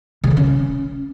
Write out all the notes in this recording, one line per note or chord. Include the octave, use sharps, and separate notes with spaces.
C#3
D#3
C#4